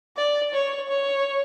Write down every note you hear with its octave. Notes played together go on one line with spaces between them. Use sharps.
D5
C#5
C#5